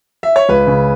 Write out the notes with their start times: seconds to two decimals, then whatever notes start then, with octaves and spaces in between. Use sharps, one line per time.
0.23 E5
0.36 C#5
0.49 C#2 B4
0.67 C#3